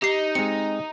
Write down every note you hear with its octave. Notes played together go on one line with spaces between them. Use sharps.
D#4 G4 C7
G#3 C4 C#7